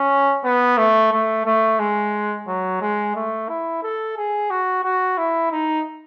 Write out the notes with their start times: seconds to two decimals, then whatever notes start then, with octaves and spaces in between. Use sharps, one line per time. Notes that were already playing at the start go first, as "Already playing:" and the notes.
Already playing: C#4
0.44 B3
0.77 A3
1.12 A3
1.45 A3
1.79 G#3
2.47 F#3
2.81 G#3
3.15 A3
3.49 E4
3.83 A4
4.17 G#4
4.50 F#4
4.84 F#4
5.18 E4
5.52 D#4